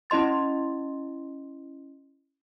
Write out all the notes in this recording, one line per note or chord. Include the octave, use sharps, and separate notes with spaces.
C#4 E4 D#5 C6 A6